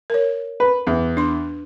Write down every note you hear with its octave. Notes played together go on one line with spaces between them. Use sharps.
A#4 C#5
B4
E2
D4 C6